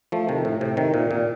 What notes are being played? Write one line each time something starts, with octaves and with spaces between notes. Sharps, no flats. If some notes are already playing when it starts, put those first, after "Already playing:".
F3 A3
C3 D#3
A2
A2 C3
C3 D#3
A#2
A#2